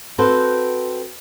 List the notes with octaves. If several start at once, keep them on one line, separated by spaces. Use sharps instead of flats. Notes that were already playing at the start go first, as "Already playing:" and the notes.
C4 F#4 A4 B4 C5